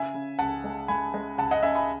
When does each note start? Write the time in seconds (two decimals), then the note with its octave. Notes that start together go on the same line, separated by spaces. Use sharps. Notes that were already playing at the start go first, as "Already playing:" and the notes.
Already playing: C#3 E5 G#5
0.14 C#3
0.39 C#2 F#5 A5
0.64 G#3
0.88 G#3 G#5 B5
1.14 G#3
1.38 C#2 F#5 A5
1.51 D#5 F#5
1.63 C#3 E5 G#5
1.75 G#5 B5